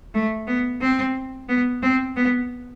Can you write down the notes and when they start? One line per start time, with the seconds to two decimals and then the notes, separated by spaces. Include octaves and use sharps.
0.14 A3
0.47 B3
0.81 C4
1.49 B3
1.83 C4
2.16 B3